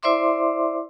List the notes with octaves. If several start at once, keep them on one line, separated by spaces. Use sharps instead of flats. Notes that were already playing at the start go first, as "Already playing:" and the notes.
E4 C5 D5 E5 C6 D6